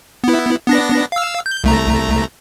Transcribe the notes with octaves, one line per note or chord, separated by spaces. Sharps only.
B3 E4
B3 D4 A#6
F5 E6
G6
C2 A3 A#5